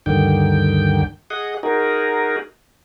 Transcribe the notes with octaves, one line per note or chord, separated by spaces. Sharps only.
D2 G2 D3 D#3 G5
G#4 D#5 F#5
D#4 F#4 G#4 A#4